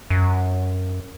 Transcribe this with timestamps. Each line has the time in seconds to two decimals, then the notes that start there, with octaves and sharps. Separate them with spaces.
0.10 F#2